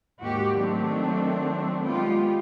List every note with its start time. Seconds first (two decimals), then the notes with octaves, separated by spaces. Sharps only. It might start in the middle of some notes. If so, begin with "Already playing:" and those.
0.22 D#2 G#2 F#4 G4
0.58 D#3 F#3 A3 C4 D4
1.86 G#3 B3 F4 G4